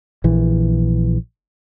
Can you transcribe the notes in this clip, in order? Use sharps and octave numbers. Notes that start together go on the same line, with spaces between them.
A#1 E3